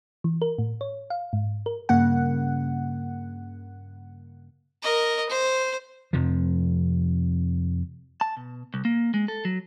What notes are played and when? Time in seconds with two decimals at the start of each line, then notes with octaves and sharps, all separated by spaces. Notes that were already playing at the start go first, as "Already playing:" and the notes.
0.24 E3
0.42 A#4
0.58 A2
0.81 C#5
1.10 F5
1.33 G#2
1.66 A#4
1.89 G2 C#3 A#3 F#5
4.83 A#4 D#5
5.29 C5
6.13 F2 C3 F3
8.21 A5
8.37 B2
8.74 C2
8.85 A#3
9.14 G#3
9.28 A4
9.45 F#3